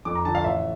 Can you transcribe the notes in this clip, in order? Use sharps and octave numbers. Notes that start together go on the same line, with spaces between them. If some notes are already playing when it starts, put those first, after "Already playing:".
F2 D6
A#5
D3 F3 A5
F5
A1 E5